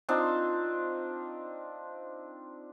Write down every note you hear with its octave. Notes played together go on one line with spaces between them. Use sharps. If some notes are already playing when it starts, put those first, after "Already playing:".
C4 D4 D#4 F4